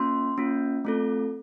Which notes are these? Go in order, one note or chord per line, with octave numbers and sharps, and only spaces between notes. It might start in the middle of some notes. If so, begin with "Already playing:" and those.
Already playing: A#3 C#4 F4 C6
A#3 C#4 F4
A3 C4 F4 A4